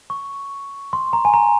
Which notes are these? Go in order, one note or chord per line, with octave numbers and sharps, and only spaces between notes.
C#6
C6
A#5
G#5
A#5